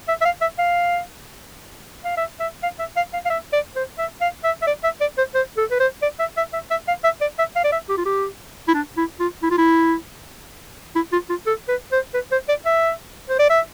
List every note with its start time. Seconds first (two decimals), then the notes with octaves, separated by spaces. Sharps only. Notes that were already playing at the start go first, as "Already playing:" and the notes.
0.08 E5
0.21 E5
0.25 F5
0.41 E5
0.58 F5
2.04 F5
2.17 E5
2.40 E5
2.63 F5
2.79 E5
2.96 F5
3.14 F5
3.26 F5
3.30 E5
3.53 D5
3.76 C5
3.98 E5
4.21 F5
4.44 E5
4.62 E5
4.67 D5
4.84 E5
5.01 D5
5.18 C5
5.35 C5
5.57 A4
5.71 B4
5.80 C5
6.02 D5
6.20 E5
6.37 E5
6.53 E5
6.71 E5
6.88 F5
7.04 E5
7.21 D5
7.39 E5
7.56 F5
7.64 D5
7.72 E5
7.89 G4
7.97 F4
8.06 G4
8.68 E4
8.74 D4
8.97 E4
9.20 F4
9.42 E4
9.51 F4
9.58 E4
10.95 E4
11.12 F4
11.30 F4
11.46 A4
11.68 B4
11.92 C5
12.14 B4
12.32 C5
12.49 D5
12.66 E5
13.29 C5
13.39 D5
13.50 E5